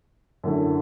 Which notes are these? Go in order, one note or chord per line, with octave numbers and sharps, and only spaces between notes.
F#2 D3 A3 E4